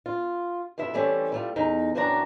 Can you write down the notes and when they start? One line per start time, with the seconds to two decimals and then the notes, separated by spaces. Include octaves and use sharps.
0.06 F4
0.78 F2 B3 E4 E5
0.94 E3 G3 A3 C4 C#4
1.32 G3 A3 F4
1.56 E2 D#4
1.95 F#2 E3 C4 D4 F#4 A#5